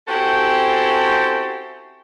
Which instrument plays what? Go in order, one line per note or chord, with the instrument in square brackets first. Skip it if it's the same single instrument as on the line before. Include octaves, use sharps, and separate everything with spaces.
[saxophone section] C4 C#4 E4 F#4 G4 A4